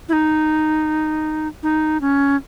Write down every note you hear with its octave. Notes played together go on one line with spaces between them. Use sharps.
E4
D#4
D#4
C#4